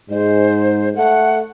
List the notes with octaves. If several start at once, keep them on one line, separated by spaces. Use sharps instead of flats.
G#2 G#3 C5
A3 F#5